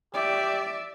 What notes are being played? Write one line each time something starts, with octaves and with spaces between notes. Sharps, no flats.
G4 D5 E5